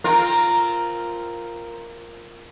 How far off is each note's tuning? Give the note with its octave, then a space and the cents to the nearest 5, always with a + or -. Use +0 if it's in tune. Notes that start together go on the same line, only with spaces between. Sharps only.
C4 +0 F4 -5 A#4 +0